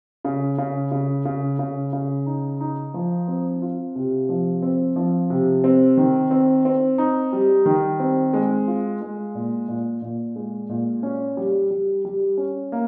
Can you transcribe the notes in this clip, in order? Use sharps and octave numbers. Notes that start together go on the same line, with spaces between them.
C#3
C#3
C#3
C#3
C#3
C#3
D#4
D#4
F3
C4
F4
C3
F3
C4
F3
C3
C4
D#3
C4
C4
D#4
G3
D#3
C4
G#3
F4
G#3
A#2
A#2
A#2
G#3
A#2
C#4
G3
G3
G3
C#4
A#3